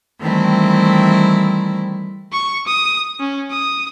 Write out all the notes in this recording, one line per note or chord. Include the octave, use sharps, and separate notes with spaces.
D#3 E3 G3 A3 C4 E4
C#6
D#6
C#4
D#6